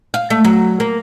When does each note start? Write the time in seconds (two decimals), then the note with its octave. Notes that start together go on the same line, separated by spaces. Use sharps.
0.14 F5
0.30 A3
0.45 F#3
0.80 A#3